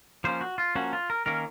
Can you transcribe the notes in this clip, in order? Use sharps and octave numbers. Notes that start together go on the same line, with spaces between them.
F3 A#3 C#4 C5
F#4
F4
F3 A#3 C#4 F#4
F4
A#4
D#3 A#3 C#4 A#4